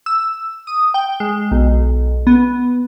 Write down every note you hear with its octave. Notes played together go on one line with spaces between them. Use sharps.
E6
D#6
G5
G#3
B1
B3